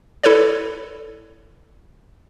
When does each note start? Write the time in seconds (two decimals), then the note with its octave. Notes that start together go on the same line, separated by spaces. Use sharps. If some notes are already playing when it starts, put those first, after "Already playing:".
0.23 E4 A4 B4 C#5 D5